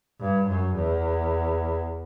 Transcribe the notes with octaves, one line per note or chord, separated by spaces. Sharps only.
G2
F#2
E2